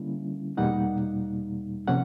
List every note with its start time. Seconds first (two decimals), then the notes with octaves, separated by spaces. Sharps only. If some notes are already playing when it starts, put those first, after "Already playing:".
Already playing: D3 G3 A#3 C#4 E4
0.57 E2 B2 G3 A#3 D#4 F#5
1.88 C3 F3 A#3 C#4 F#5